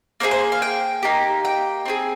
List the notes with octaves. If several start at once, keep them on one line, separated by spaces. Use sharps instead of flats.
A#3 F4 G#4 C5
C5
F5
G5
A#3 D#4 G4
G5
C4 F4 G#4